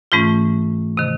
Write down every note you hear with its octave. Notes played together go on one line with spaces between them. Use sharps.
G#2 E3 A3 C#4 F4
C3 D#3